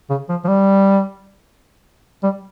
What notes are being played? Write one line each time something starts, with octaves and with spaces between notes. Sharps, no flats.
C#3
F3
F3
G3
G3